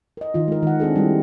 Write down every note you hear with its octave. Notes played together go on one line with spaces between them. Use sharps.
A#4 D#5
D#3 F4
G#3 A#4
D#3 F#5
C4 D4 G#4 A4
G3 E4